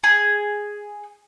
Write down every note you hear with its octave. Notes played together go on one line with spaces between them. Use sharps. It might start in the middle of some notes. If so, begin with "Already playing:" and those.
G#4